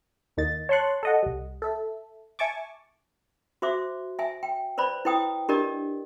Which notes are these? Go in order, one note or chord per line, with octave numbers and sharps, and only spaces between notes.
D#2 A#3 D#4 A6
C#5 A5 C6 C#6 F#6
A4 D#5 F#5
C2 G3
A4 E5
E5 G#5 A5 C#6 D6
F#4 C5 E5 D6
E5 G#5
G5
B4 C5 D5 B5
E4 B4 G5 D#6
D4 G4 A#4 D5 D#5